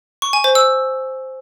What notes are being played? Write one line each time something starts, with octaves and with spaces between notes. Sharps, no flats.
C#6
G#5
C5
E6